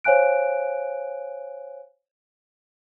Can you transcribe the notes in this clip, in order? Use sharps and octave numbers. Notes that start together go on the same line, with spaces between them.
C5 C#5 F5 G#5 F#6 D7